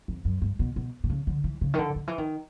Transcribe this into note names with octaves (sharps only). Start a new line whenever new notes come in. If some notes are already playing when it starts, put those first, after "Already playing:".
F2
F#2
G2
B2
B2
C3
C#3
D3
E3
C#3
D#3
D3
D#3
E3
D#3